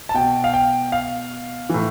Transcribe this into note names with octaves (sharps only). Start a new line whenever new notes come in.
A5
B2 G5
F5
G5
F5
A2 E3